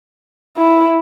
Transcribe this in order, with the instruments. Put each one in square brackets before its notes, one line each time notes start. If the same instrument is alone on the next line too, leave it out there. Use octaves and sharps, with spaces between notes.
[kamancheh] E4